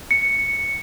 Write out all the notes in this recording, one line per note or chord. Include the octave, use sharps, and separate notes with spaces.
C#7